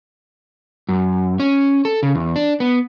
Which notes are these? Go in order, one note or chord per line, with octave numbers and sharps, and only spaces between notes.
F#2
C#4
A4
C#3
E2
D4
B3